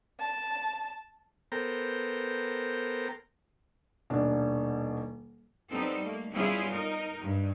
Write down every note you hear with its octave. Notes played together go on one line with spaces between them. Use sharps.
A5
B3 A4 A#4 C5 G5 A#5
D#1 B2 D4
G3 B3 C4 D#4 A4
A3 A#3
G3 B3 C#4 E4 F4 G#4
D#4 A#4
G2